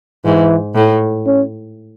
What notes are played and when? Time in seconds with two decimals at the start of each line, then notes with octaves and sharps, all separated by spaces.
0.25 G#2 E3
0.75 A2
1.27 C#4